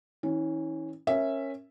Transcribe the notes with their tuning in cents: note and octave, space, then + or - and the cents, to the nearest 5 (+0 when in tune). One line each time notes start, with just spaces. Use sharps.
E3 -40 C#4 -10
C#4 -15 A#4 +0 E5 +0